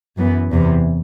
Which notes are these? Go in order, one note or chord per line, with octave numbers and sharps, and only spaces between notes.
F#2 E3 B3
E2 C3 E3